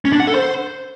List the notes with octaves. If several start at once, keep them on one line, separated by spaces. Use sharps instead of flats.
C#4
D4
F#5
A4
C5